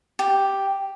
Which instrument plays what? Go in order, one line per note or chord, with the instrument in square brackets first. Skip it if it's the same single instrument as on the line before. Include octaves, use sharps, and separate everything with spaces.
[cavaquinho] G4